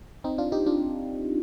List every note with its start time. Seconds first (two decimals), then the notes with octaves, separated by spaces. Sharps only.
0.24 C4 D#4
0.38 D4 F4
0.52 D#4 G4
0.66 D4 F4